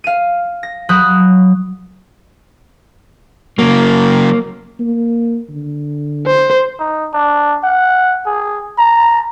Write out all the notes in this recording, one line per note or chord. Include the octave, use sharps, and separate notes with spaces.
F5 D#7
A#6
F#3 B5 D#6 F#6 G6
C#3 F#3 A#3
A#3
D3
C5
D#4
D4
F#5
G#4
A#5